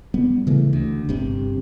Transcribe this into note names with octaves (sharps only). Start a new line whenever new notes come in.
G3 B3
C#3 E3 A3
D2
G1 G2 C3